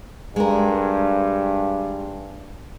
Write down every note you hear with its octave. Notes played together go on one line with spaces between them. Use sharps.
G2 G#3 A#4